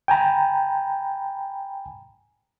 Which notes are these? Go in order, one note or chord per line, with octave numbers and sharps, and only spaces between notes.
G5 G#5 A#5 B5